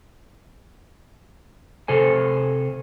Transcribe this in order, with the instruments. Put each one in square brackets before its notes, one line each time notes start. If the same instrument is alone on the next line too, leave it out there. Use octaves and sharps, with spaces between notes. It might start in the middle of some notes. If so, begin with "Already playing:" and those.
[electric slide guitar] C3 A4 C5 G#5